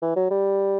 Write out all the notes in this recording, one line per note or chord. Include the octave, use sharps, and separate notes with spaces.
E3
F#3
G3